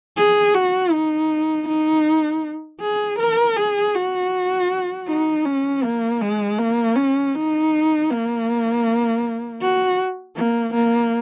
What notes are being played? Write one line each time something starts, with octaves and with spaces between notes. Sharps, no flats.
G#4
F#4
D#4
D#4
G#4
A#4
G#4
F#4
D#4
C#4
A#3
G#3
A#3
C#4
D#4
A#3
F#4
A#3
A#3